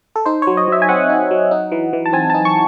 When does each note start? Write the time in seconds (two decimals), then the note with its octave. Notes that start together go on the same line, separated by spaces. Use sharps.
0.16 A4
0.26 D#4 C5
0.42 F#3 C#5
0.57 D#5
0.67 F#3 E5
0.82 G#5
0.89 C4 F#5
1.09 D#4
1.31 F#3
1.51 D#4
1.72 E3
1.93 E3
2.06 A5
2.13 C4 G#5
2.30 D#4 A5
2.45 C#6